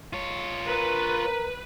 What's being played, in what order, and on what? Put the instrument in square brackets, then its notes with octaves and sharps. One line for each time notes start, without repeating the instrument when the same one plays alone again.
[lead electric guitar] F4 C#5
[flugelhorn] A#4 [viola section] B4